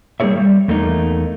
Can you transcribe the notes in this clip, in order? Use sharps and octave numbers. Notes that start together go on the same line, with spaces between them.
G3 A#3 D4 G#4 C#5 E5
G3
E2 A3 A#3 D#4